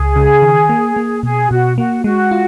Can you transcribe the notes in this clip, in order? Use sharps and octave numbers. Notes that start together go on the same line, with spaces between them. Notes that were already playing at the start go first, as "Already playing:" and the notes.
Already playing: C#2 G#4
C#3
D#3
A#3
A#3
B2 G#4
B2 F#4
A#3 F#4
G#3 F#4
F4